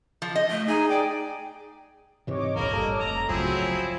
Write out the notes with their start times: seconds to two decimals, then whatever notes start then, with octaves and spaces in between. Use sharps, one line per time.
0.22 F3
0.36 D#5
0.50 A3
0.68 D#4 G#4 G#5
0.89 D5 G5
2.27 G#2 C3 E3 C#5 D#5 D6
2.56 D#1 A#1 C#3 A#3 A#4
2.72 G#1 G2 A4
3.00 F1 A#5
3.29 G1 C#2 A2 F3 F#3 C4 E4 G#4